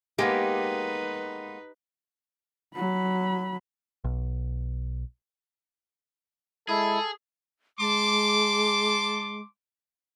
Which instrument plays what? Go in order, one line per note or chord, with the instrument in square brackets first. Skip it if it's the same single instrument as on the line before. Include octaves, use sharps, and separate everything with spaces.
[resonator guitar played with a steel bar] G#3 A#3 B3 [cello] D#4 B4 [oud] G4
[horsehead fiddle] F#3 B5
[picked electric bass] B1
[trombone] G#3 [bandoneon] E4 [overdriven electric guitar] G#4 [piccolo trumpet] A4
[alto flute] G#3 [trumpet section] A5 C6 D6